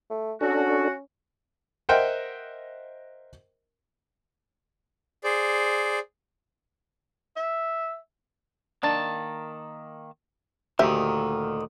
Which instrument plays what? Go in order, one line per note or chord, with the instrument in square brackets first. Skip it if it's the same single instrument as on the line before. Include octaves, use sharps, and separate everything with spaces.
[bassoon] A3
[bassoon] C#4 [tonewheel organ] D4 A4 [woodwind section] F#4
[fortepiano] A#4 C5 D#5 E5 F#5 G5
[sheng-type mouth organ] G#4 C5 D5
[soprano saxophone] E5
[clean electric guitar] D#3 A#3 A5 [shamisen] D4
[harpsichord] D2 [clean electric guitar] A#2 D#3 [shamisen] G4 E5